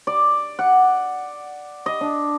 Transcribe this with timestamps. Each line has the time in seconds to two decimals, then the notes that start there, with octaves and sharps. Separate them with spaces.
0.07 D5
0.59 F#5
1.86 D#5
2.01 D4